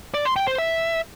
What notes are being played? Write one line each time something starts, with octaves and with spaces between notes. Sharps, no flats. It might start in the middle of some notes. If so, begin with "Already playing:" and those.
D5
C6
G5
C5
E5